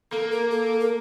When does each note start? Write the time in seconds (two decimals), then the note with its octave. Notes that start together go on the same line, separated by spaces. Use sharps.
0.12 A#3 A4
0.31 A#4
0.51 A4
0.80 A#4